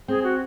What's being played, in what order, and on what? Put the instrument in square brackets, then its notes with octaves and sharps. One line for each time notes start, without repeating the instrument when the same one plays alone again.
[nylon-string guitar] C4 [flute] G#4
[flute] F#4